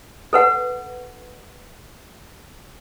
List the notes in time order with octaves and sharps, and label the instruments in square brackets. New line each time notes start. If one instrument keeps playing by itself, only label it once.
[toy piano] A4 B4 F#5